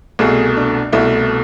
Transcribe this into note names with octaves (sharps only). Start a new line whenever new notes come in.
C2 B2 A3 G#4
D4
C2 B2 A3 E4